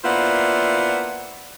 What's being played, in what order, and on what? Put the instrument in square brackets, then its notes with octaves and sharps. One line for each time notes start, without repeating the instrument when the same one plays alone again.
[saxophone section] A#3 B3 D4 E4 F4 C5